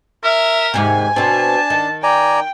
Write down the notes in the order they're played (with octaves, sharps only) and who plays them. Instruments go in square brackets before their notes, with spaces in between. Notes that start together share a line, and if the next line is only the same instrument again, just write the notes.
[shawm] A#4 [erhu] E5
[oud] D#2 G#2 C3 [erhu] G#5
[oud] B2 C4 [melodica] D4 [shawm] A5
[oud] D#3
[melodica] D5 G#5 A#5 [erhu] G5